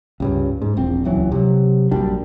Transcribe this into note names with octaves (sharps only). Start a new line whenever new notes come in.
C#2 G2 C#3
G#2
E1 A#1 C4
D#1 C#2 E3 F#3
C3 F#3
A#1 F#2 G3 D4